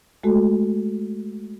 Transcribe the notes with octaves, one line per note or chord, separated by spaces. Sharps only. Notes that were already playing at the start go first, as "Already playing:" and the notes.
G#3 A3 F#4 A4